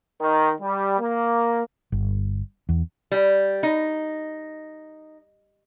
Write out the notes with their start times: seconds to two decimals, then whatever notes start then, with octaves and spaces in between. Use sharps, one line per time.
0.21 D#3
0.61 G3
0.99 A#3
1.92 G1
2.69 E2
3.12 G3
3.63 D#4